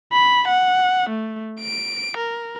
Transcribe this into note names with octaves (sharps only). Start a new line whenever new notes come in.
B5
F#5
A3
D7
A#4